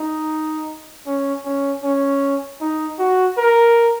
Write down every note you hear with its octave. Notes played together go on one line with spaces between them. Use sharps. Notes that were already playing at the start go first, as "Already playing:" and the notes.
Already playing: D#4
C#4
C#4
C#4
D#4
F#4
A#4